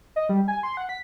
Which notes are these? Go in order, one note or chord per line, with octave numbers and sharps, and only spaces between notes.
D#5
G3
G#5
C6
F#5
B6